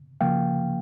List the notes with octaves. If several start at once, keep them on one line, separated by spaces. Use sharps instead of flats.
C#3 F3 A#3 F5 G5